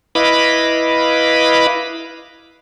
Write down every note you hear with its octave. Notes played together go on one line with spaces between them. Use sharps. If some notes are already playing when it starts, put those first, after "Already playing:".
E4 B4 D#5 F5 B5 D6